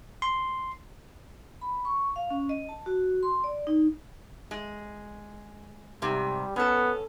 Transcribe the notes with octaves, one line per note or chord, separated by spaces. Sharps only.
C6
B5
C#6
F5
C#4
D#5
A5
F#4
C6
D5
D#4
G#3
G#2 C3 G3
B3 C#4 A4